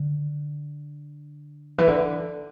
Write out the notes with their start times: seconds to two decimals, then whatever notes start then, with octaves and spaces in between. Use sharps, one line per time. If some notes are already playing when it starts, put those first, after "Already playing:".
Already playing: D3
1.78 E3
1.88 D3